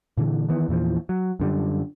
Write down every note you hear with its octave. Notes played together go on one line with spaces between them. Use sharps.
A#2 D3 E3
D#3 E3 B3
E2 A#2 E3 F3
F#3
F#2 D3 G3